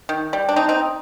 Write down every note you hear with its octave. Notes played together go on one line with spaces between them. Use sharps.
D#3
G3
D4
C4 D#4
C4 D#4